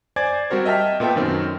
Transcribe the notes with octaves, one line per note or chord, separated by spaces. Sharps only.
C5 D5 G#5 D6 G#6 A6
G3 C4 F#4 A#4 C5
D#5 E5 G5 A5 F6 B6
A#2 B3 A4 G5
F#2 D#3 C4 C#4